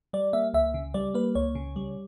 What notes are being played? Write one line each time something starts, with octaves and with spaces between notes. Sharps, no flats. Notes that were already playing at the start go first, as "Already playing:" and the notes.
G3 D5
A#3 E5
C#2 E5
C#3
G3 D5
A#3 B4
C#2 C#5
C#3
G3